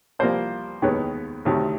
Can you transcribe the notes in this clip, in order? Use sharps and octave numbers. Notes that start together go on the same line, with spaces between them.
C2 C3 F3 A#3 C5 D5
D#2 D#3 G#3 B3 B4 C#5
D2 C3 D#3 F#3 A3